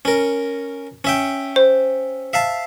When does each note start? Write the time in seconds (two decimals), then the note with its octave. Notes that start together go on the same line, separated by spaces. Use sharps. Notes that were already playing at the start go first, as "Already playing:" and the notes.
0.05 C#4 A#4
1.04 C#4 E5 G5
1.56 C5
2.33 E5 F5 A5